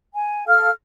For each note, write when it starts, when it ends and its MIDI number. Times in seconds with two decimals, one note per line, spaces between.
0.15 0.45 80
0.47 0.69 69
0.47 0.69 77
0.47 0.69 89